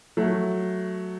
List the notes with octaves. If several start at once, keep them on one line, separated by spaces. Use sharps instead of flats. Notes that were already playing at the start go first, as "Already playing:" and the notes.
F#3 A3